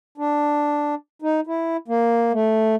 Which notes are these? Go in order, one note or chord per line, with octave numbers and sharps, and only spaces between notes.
D4
D#4
E4
A#3
A3